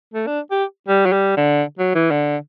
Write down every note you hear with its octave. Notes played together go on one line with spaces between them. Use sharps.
A3
D4
G4
G3
F#3
G3
D3
F#3
E3
D3